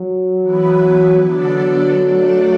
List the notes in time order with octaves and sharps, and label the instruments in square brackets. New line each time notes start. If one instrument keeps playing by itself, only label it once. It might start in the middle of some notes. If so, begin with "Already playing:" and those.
Already playing: [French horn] F#3
[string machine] E3 B3 E4 B4
[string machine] D3 B3 D4 A4 D5 [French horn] F#3
[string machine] A3 D4 A4 D5